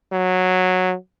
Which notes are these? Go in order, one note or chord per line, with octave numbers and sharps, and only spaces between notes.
F#3